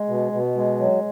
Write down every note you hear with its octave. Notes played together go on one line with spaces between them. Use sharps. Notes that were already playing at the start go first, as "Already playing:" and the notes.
Already playing: G#3
B2
B2
G#3
F#3